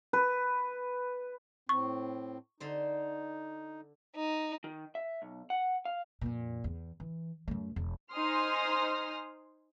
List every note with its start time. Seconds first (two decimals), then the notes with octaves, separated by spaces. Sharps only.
0.13 B4
1.69 A2 C4 C#6
2.60 D3 D#4 C5
4.16 D#4
4.64 D#3
4.95 E5
5.22 B1
5.50 F#5
5.85 F5
6.21 F2 A#2
6.64 E2
7.00 E3
7.48 F#2 A3
7.76 E1
8.12 D#4 C5 G#5 C6 D#6 F6